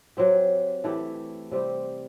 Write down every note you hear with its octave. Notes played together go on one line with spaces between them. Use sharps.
F#3 C4 G4
E3 A3 E4 G4
C3 G3 C4 G4